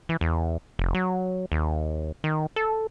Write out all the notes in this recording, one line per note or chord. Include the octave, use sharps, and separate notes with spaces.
E3
E2
F1
F#3
D#2
D#3
A4